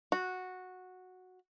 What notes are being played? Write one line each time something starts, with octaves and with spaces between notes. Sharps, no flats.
F#4